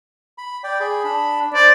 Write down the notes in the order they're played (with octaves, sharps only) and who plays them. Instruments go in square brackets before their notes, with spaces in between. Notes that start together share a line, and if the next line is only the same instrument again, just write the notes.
[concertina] B5
D5 G5
G#4 B5
D4 B5
[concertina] C5 [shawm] D5